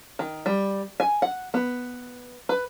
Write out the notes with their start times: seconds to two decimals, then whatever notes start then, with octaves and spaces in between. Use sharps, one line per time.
0.19 D#3
0.46 G3
1.00 G#5
1.22 F#5
1.54 B3
2.49 B4